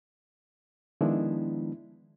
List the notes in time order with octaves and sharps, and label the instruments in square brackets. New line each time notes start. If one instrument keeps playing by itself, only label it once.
[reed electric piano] D#3 F3 G#3 B3 D4 E4